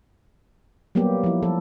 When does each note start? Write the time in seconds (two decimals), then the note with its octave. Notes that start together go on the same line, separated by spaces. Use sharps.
0.95 F#3 G3 A#3 B3 G4
1.24 F3 E4
1.43 F3 A4